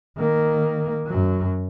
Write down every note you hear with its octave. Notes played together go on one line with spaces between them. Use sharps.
D#3 A#3
F#2 F#3